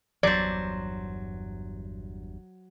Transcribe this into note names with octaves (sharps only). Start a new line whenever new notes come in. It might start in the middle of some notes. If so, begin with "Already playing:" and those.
G1 E2 G2 F#3 C5 D5